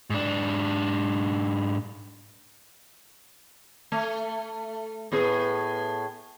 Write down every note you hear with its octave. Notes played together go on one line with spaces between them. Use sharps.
G#2 D4
A3
A2 B3 G#4